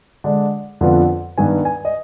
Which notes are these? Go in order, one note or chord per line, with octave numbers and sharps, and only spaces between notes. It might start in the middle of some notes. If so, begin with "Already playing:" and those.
D3 G#3 D4
F2 D3 F3 B3 F4
G2 D#3 B3 G#5
G#5
D#5